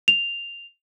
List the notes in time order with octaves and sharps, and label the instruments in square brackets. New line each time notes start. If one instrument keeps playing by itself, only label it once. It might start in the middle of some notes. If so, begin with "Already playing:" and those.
[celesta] F7